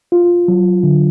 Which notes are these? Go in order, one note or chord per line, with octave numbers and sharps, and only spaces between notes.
F4
F#3
D3